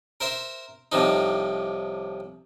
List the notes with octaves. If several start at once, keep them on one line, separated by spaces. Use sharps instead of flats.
A#4 C5 E5 C6
C2 A2 C3 F3 D#4